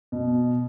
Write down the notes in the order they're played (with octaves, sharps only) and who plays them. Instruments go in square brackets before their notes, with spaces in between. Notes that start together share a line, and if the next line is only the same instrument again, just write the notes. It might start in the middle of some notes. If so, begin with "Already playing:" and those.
[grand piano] B2